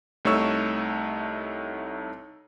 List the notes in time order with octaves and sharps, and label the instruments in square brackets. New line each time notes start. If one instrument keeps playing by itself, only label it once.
[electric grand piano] C2 A3 D#4 C#5 C#6 E6